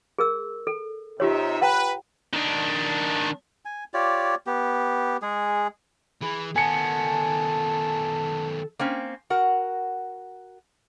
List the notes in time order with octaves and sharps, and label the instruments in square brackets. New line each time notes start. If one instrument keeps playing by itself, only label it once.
[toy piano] G#4 A#4 E6
A4
[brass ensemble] C3 D#4 E5 [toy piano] F4 G4 C#5
[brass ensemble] B4 [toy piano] F#5 G5 A#5
[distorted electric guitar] D#3 D4
[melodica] G#5
F4 G4 C#5 D5
B3 G4
G#3 G#4
[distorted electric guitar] E3 [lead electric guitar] G#4 [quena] B5
[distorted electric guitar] D#3 B3 [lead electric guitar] A4 F#5 [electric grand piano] G#5 C#7 [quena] A5
[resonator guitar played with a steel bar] A#3 C4 C#4
F#4 A#4 F#5